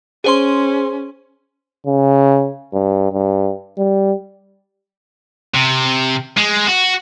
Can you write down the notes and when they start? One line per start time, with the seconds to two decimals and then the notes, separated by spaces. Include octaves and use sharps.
0.24 C#4 G#4 C5 C6
1.87 C#3
2.73 G2
3.12 G2
3.78 G3
5.55 C3
6.38 G#3
6.67 F#4